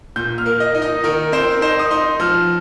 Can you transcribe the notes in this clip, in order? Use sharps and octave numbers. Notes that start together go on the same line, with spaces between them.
A#2 G6
F6
A#3
D#5
D#4
D#5
D#3 A#4
C4 C5
D#4 C5
D#6
D#4 C6
F3 F6